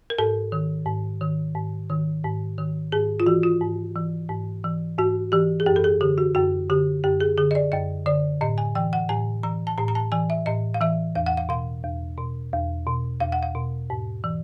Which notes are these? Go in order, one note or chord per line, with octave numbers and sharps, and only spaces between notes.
A#4
G#2 A4
D#3
G#2
D#3
G#2
D#3
G#2
D#3
G#2 G#4
F4
E3 F#4
F4
G#2
E3
G#2
E3
G#2 F#4
E3 G4
G#4
F#2 G4
A4
G#4
D3 G4
F#4
F#2 F#4
D3 G4
F#2 G4
G#4
D3 G#4
D#5
D5
F#2 D#5
D3 D5
A2 D#5
G#5
E3 G5
F#5
A2 G#5
E3 A#5
A5
A2 A#5
A#5
A5
E3 G#5
E5
A2 D#5
F5
E3 E5
E2 F5
F#5
F5
B2 F5
E2
B2
E2
B2
E2 F5
F#5
F5
B2
G#2
E3